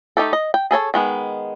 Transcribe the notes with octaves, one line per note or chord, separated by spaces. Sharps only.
A3 D#4 G4 A4
D#5
G5
G#4 A4 C#5 A5
D#3 G#3 B3